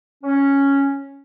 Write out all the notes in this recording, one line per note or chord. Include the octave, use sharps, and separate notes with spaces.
C#4